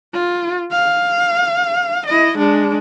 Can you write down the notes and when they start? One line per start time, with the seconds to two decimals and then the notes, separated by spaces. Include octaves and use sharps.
0.14 F4
0.72 F5
2.07 E4 D#5
2.38 G#3 D4